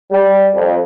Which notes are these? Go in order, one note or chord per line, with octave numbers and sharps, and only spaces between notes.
G3
F2